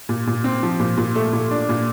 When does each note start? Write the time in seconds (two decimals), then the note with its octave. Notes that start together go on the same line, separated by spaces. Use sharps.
0.09 A#2
0.27 A#2
0.44 C4
0.63 F3
0.80 A#2
0.97 A#2
1.16 A3
1.33 A#2
1.51 D4
1.69 A#2